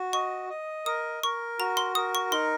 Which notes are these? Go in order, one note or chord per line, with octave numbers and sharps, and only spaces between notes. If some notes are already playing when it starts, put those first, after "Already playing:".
Already playing: F#4
D#5 C#6
D#5
A#4 D#6
A#4 C#6
F#4 A#5
C6
A#4 D#6
C#6
D#4 C6